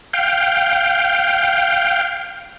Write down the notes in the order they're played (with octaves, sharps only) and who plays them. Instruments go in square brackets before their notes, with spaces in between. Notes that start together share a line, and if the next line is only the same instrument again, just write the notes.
[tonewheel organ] F5 G5